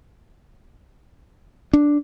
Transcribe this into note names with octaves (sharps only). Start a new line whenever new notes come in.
D4